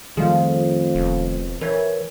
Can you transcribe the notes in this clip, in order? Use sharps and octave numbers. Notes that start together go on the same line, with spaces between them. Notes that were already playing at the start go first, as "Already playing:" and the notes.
F2 D#3 F3 G3 A3 F4 G#4
E1
E3 A#4 C#5 G#6